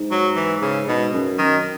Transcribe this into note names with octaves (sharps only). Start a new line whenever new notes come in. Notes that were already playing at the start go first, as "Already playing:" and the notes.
Already playing: G#2
F#3
E3
C#3
G#2 B2
F#2
F#2 D#3